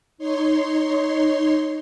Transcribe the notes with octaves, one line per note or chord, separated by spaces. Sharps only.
D#4 C#5 C6